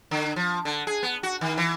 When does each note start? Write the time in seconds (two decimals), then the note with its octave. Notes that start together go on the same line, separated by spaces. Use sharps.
0.11 D3
0.36 F3
0.65 D3
0.87 G#4
1.03 B3
1.23 F#4
1.41 D#3
1.57 E3